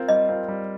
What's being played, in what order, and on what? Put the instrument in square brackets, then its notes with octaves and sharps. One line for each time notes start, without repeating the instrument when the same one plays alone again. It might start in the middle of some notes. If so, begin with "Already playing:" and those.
Already playing: [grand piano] C4 F4 A#4
[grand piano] G3 [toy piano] D#5
[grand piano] C4 F4 A#4
G3